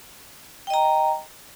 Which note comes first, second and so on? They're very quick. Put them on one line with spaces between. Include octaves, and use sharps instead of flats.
G5 D#5 A#5